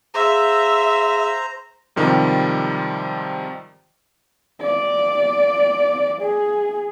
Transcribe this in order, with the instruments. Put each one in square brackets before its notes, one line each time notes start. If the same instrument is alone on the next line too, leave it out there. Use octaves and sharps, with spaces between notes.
[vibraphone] G#4 F5 [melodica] C5 A#5 [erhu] E5
[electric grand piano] G#2 C3 D#3 F3 G3
[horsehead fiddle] D5
G#4